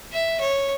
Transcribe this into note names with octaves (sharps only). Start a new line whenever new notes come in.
E5
C#5